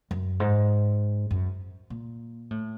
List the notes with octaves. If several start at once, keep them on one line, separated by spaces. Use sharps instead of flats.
F#2
G#2
F#2
A#2
A2